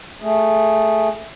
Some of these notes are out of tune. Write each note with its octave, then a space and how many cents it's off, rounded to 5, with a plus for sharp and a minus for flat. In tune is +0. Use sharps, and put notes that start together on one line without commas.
A3 +0 G#4 +0